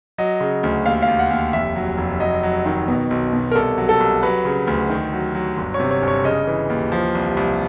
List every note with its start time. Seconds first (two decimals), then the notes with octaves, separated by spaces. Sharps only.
0.18 F#3 D#5
0.41 C#3
0.63 D2
0.86 D#2 F5
1.02 F5
1.08 D#2
1.19 F#5
1.31 D#2
1.53 F1 E5
1.76 F#3
1.98 F1
2.20 F#3 D#5
2.43 F#3
2.66 D#3
2.88 B2
3.10 B1
3.33 B2
3.51 A#4
3.55 C2 A4
3.78 F#3
3.89 A4
4.00 C2
4.23 F#3 B4
4.45 C#3
4.67 D2
4.90 D#3
5.13 F#3
5.35 F#3
5.57 G1
5.74 C#5
5.80 C3
5.91 C#5
6.02 G1
6.08 C#5
6.24 C#3 D#5
6.47 E3
6.70 D#2
6.92 F3
7.15 C2
7.37 C2